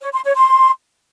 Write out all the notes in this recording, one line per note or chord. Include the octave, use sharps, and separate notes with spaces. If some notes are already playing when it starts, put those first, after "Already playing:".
C#5
C6
C#5
C6